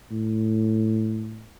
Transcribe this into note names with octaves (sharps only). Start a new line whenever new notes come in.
A2